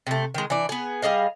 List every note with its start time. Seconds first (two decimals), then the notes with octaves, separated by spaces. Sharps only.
0.07 C3 A3
0.34 D#3 G#3
0.50 E3 D4
0.69 B3 G#4
1.02 G3 G#4 D#5 F5